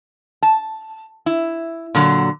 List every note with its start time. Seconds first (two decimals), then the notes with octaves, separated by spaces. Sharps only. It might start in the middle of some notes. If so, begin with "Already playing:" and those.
0.42 A5
1.26 E4
1.95 A#2 D3 F#3